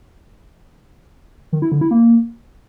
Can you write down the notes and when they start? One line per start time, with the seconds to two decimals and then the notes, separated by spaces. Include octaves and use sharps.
1.52 D#3
1.62 E4
1.72 D3
1.81 E4
1.91 A#3